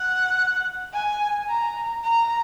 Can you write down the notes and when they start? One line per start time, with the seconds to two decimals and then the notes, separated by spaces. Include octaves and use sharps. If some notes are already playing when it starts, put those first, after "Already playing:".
Already playing: F#5
0.93 G#5
1.49 A#5
2.04 A#5